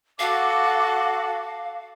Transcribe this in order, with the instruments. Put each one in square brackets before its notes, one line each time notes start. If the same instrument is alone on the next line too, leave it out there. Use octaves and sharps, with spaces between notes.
[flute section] F#4 D6 [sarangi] A4 [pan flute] F5